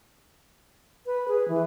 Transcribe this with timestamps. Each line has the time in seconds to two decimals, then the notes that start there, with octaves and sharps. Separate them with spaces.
1.06 B4
1.28 G#4
1.48 E3